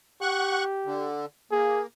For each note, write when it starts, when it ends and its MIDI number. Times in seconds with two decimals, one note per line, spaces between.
0.21 1.08 67
0.21 0.64 78
0.21 0.64 85
0.21 0.64 90
0.85 1.26 50
1.52 1.86 58
1.52 1.82 68